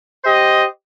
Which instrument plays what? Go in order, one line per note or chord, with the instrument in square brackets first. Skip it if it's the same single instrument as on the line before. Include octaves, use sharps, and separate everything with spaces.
[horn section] G4 C5 D#5